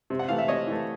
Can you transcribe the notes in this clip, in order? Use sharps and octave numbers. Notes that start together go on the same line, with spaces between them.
C3
F#5
E3 A3 F5
E5
C3 C#5 D#5
E3 A3